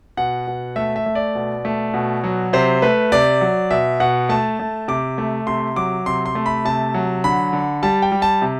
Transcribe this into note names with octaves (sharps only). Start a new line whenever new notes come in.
B2 F#5
B2
A3 E5
E5
A3
D5
B2
A3
B2
F#3
C3 C5
A3 B4
C3 D5
F#3
B2 E5
B2 F#5
A3 A5
A3
C3 D6
A3
C3 C6
F#3 D6
C3 C6
C6
A3
B5
C3 A5
F#3
D3 B5
D3
G3 A5
G5
G3
A5
C3